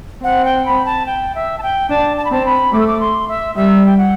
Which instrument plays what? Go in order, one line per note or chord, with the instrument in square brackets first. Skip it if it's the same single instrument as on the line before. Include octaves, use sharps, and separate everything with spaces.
[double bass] C4 [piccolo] F#5
[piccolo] G5
B5
A5
G5
E5
A5
G5
[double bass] D4 [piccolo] A5
[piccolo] A5
B5
[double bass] C4 [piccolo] A5
[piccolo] B5
[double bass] A3 [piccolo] D6
[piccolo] E6
D6
C6
E5
[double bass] G3 [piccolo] E5
[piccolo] G5
F#5